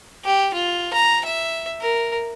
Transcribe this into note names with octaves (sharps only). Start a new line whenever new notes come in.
G4
F4
A#5
E5
A#4